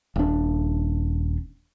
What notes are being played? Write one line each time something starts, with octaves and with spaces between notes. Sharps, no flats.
D#1 D4